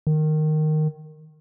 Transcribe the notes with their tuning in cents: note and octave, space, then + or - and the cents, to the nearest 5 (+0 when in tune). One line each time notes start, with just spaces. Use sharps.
D#3 -10